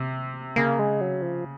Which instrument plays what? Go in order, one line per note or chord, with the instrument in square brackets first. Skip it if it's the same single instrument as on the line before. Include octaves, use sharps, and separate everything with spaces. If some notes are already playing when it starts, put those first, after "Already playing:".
Already playing: [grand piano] C3
[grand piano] C#3 [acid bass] A#3
[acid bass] G#3
F#3
F3